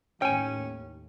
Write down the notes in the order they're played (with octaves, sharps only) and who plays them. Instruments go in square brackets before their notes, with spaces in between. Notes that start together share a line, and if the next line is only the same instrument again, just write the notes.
[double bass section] D#2 A2 [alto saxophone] C#4 [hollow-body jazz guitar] G5 G#5